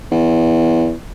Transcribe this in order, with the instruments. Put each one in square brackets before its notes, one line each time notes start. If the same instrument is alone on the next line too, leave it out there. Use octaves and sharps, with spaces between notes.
[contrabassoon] E2